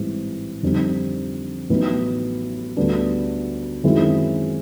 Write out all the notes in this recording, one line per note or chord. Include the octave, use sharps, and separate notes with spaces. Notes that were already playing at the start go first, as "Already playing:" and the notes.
Already playing: A1 G#2 E3 G3 C4
F2 D3 G3 C4 D#4
A1 A2 F#3 B3 D#4
D2 D3 G3 B3 D4
F#2 D#3 G#3 C4 E4